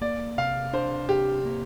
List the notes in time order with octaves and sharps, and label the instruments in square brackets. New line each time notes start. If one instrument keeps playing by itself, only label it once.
[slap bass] A#3 [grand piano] D5
[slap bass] C3 [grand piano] F5
[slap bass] D4 [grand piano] C5
[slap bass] C3 [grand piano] G4
[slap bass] A#3